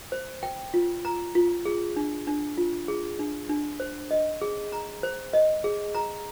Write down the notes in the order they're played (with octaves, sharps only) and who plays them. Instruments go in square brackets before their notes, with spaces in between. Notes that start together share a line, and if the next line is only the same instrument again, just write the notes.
[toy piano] C5
G5
F4
A#5
F4
G#4
D4
D4
F4
G#4
D4
D4
C5
D#5
G#4
A#5
C5
D#5
G#4
A#5